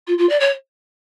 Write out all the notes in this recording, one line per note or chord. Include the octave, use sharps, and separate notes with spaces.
F4
F4
D5
C#5